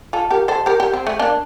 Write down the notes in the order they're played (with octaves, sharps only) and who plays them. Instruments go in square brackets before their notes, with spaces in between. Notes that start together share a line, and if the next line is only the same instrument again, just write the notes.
[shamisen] F4 A4
G4 A#4
A4 C5
G4 A#4
G4 A#4
C4
A3
A#3 D4